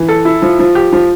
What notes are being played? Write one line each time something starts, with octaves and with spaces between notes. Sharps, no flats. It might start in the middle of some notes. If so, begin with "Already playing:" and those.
Already playing: E3
A4
E4
F3
F3
G4
F3